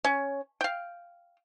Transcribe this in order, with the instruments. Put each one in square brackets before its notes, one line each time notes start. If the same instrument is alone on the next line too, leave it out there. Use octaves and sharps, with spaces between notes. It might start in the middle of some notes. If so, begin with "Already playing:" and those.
[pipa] C#4
F5 G5